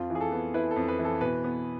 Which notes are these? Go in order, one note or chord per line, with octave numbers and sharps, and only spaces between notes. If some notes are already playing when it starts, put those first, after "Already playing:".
Already playing: F2 F4
E3
G#4
A4
B3
E4 B4
A4
F2
B4
E3
A4
B2 B4
B3